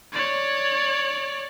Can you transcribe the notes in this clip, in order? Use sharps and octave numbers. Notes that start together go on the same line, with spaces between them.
C#5 D5